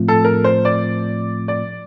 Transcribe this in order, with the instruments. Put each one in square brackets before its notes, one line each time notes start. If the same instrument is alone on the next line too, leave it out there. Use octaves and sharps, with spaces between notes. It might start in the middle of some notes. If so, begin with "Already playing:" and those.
Already playing: [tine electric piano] A2 F3 A3 C4 F4
[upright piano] A4
A#4
C5
D5
D5